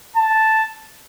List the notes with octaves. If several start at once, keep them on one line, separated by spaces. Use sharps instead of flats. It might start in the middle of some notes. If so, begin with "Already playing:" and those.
A5